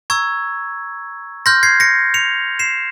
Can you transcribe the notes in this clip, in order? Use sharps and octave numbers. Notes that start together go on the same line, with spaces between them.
A#5 C#6 E6 G#6
C6 F6 G6 A#6
G#6 C7
A#6 C#7
C#7 F7
C7 E7